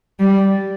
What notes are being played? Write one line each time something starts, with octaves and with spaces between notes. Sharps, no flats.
G3